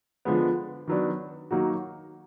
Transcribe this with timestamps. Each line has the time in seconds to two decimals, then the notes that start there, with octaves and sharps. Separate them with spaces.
0.25 D3 F3 G#3 B3
0.87 D#3 F#3 B3 D4
1.51 D#3 F#3 A#3 D#4 F#4